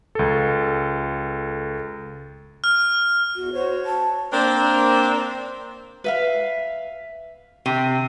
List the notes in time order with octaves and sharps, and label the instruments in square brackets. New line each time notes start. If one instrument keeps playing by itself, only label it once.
[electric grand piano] C#2 A4
[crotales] F6
[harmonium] E2 [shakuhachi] F#4
[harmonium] F#4 C#5 [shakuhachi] C5
[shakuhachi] A5
[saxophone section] A#3 C4 D4
[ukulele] B4 E5 F5
[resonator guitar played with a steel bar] C3